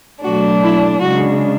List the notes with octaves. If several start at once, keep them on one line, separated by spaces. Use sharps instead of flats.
B2 F#3 A3 D4 F#4
E4
C#3 G#3 D4 F#4